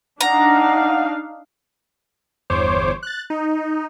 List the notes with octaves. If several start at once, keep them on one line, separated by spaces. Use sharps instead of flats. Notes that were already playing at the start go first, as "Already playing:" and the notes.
D4 D#4 F5 F#5 A#5
G1 E2 C5 C#5 D6
F#6 A6
D#4